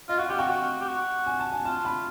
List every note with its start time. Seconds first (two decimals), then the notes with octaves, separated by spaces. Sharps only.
0.09 F4 D#5
0.18 F#4 F5
0.29 G4 F#5
0.39 F#4 G5
0.49 F#4
0.81 G4
0.88 F#4
1.27 G#5
1.40 A5
1.52 G#5
1.65 F4 A5
1.85 B5